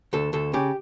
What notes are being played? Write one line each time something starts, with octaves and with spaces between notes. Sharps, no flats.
D2 A4
D2 A4
C#3 G4